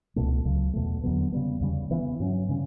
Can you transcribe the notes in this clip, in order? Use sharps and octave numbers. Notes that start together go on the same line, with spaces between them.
C#2 B2 A3
C#2 C#3 F#3
E2 B2 A3
E2 D3 F#3 B3
C#3 G3 B3
E2 C#3 G3
C#3 E3 B3
G2 F#3 C#4
C#3 G3 C#4